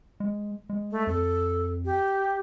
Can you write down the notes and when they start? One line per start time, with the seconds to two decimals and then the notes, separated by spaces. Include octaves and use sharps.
0.20 G#3
0.69 G#3
0.91 A3
1.07 F2 A4
1.85 G4